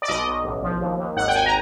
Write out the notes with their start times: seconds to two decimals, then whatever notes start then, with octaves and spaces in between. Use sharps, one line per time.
0.02 D5
0.08 B1 D#5
0.27 B1
0.44 A1
0.63 F3
0.80 D#2
0.99 D#2
1.16 G#1 F#5
1.28 G5
1.35 G#1 G#5
1.46 A#5